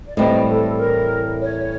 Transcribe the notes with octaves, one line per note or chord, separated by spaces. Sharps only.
D5
A2 E3 G3 C4 D#5
A4
A#4
C#5